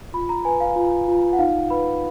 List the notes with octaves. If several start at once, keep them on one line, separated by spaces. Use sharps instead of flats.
F4 B5
A#5
B4 G#5
F5
F4
F4
F#5
D#4 F5
B4 B5